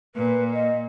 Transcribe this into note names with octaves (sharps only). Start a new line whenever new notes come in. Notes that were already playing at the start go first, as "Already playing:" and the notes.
A#2 B4
D#5